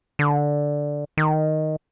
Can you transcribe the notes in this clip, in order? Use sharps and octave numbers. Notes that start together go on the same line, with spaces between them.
D3
D#3